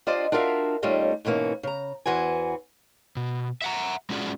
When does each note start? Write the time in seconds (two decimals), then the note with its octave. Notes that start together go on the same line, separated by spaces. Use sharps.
0.07 D4 F4 G4 C5 D5 D#5
0.32 D4 F4 F#4 A#4 E5 F5
0.82 D#2 G3 A3 C#4 F4 D#5
1.25 G#2 B2 E3 A#3 C#4
1.63 C#3 A#5
2.06 E2 E3 F#4 C5 G#5
3.16 B2
3.62 E5 F#5 A#5
4.10 G#3 C#4 F4 F#4 G#4 D5